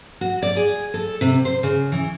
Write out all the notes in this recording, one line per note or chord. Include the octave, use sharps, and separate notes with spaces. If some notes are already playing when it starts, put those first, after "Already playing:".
F#4
D5
G#4
A4
C3
C5
C#3
E3